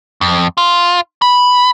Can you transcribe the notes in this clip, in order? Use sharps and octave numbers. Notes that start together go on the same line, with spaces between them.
F2
F4
B5